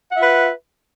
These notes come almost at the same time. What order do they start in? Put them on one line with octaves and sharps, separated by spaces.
F#5 E5 F4 B4